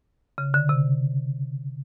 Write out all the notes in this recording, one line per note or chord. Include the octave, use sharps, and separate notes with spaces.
C#3
D3
C3